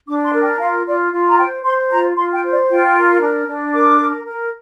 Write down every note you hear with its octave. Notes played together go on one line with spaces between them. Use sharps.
D4 D6
C6
A#4
G5
F4 F5
F4 D5
F4
A#5
C5 G5
C5 C6
F4 A#5
F4 C6
G5
C5
D5
F4 G5
A#4
D4
D4
A#4 D6
A#4
A#4